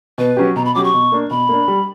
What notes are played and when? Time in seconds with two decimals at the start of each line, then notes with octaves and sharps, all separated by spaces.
0.18 B2 B4
0.37 F#3 C#4 G4
0.56 B2 A#5
0.65 B5
0.75 F#3 C#4 G4 D6
0.84 C#6
0.94 B2
1.12 A#3 D4
1.31 B2 B5
1.49 A#3 D4
1.68 G3